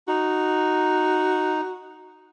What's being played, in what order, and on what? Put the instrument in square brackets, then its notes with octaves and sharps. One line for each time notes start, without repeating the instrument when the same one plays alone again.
[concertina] D#4 [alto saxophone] F#4